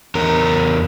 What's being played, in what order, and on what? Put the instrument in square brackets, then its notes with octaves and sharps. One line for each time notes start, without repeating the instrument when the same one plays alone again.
[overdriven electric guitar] E2 A#4